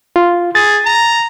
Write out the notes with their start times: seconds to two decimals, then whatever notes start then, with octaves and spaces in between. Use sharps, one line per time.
0.16 F4
0.55 G#4 A6
0.86 A#5